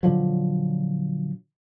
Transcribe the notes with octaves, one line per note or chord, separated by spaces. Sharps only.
A#2 D3 F3 F#3